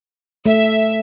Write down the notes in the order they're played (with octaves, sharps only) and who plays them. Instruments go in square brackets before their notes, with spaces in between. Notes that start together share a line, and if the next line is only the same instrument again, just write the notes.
[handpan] A3 [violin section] E5